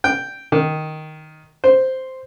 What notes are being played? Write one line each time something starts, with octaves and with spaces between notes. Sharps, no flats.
G5
D#3
C5